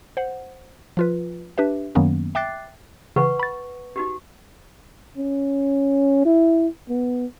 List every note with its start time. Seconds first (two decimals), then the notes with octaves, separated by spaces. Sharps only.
0.17 C5 F#5
0.97 F3 F4 B4
1.58 D4 G4 B4 E5
1.95 F#2 D#3 F#3 A#3 B3 C#4
2.35 E5 G5 D6 F#6 A6 C7
3.16 C#3 E3 B4 F#5 C#6
3.39 B5 A6
3.96 D#4 F#4 G4
5.18 C#4
6.25 E4
6.89 B3